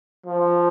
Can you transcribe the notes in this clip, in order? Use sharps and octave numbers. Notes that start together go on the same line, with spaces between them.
F3